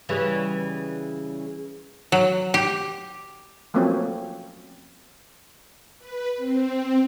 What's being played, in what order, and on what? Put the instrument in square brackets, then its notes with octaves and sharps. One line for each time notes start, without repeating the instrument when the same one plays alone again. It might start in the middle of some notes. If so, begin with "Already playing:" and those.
[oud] C#3 E3 G3
[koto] F#3
G4
[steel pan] F3 F#3 A3 A#3 C4 C#4
[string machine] B4
C4